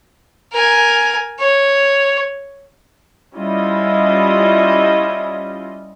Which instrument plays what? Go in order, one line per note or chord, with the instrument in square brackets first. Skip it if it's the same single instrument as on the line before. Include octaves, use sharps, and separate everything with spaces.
[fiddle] A#4 G#5
C#5
[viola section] G3 C#4 E4 F4 D#5